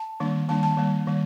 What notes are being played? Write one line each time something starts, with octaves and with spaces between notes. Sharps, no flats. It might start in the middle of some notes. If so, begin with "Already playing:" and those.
Already playing: A5
D#3 G3 A#3 D4
D#3 G3 A#3 D4 A5
A5
D#3 G3 A#3
D#3 G3 A#3